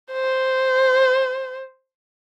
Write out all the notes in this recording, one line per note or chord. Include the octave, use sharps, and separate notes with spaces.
C5